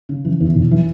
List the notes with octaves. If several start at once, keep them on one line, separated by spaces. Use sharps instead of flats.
C#3
E3
E2
E1
E3